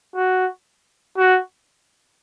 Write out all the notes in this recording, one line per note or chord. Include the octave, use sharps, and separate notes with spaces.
F#4
F#4